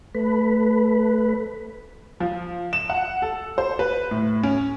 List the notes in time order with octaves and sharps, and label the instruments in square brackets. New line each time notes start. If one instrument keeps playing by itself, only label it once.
[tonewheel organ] A3 B4
[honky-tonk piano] F3
E7
F#5
A4
C5
B4
A2
C#4